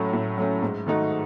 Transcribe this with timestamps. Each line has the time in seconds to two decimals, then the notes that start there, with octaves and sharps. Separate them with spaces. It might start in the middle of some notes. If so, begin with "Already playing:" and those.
Already playing: A2 F#3 A3 C#4
0.13 A2
0.38 F#3 A3 C#4
0.62 G#2
0.86 D#3 A3 D#4 F#4